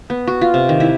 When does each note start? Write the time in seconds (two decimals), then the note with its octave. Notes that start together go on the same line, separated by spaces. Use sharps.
0.10 B3
0.27 F#4
0.41 F4
0.54 C3
0.69 D#3
0.80 E4